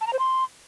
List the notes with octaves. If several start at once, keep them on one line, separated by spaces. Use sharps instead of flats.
A5
A#5
C5
C6